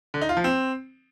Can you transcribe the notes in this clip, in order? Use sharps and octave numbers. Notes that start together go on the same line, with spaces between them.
D3
D#4
F4
F3
C4